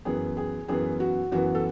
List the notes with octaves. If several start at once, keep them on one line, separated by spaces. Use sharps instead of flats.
F#2 E3 B3 G#4
G#4
F#2 E3 B3 G#4
F#4
F#2 E3 B3 F#4
A4